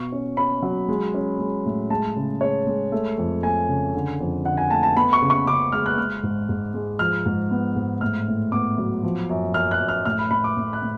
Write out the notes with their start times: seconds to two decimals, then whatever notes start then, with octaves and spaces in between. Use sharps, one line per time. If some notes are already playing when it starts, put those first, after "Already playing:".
Already playing: B2 C#6
0.12 C#4
0.37 C#4 B5
0.62 F#3
0.89 G#3
1.14 C#4
1.39 G#3
1.66 A2
1.90 G#3 A5
2.16 C#3
2.41 G#3 C#5
2.67 G#3
2.92 A3
3.18 F2
3.43 A3 G#5
3.69 C#3
3.95 D3
4.20 F2
4.45 D3 F#5
4.57 G#5
4.70 A3 A5
4.83 A5
4.96 B3 B5
5.13 C#6
5.22 C#3
5.30 C#6
5.47 C#3 D6
5.72 G#3 F6
5.86 F#6
5.98 G#3 F6
6.23 G#2
6.49 G#2
6.74 G#3
6.99 F3 F6
7.26 G#2
7.51 B3
7.76 G#2
8.01 A2 F6
8.28 A2
8.52 B3 D6
8.78 F#3
9.03 F3
9.29 F#2
9.54 F#2 F6
9.71 F#6
9.80 F#2
9.89 F6
10.05 A2 F6
10.19 B5
10.30 A2 B5
10.44 D6
10.57 A2
10.73 F#6
10.82 A2